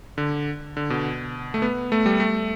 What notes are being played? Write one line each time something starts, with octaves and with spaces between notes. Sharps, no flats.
D3
D3
B2
A3
B3
A3
G3
A3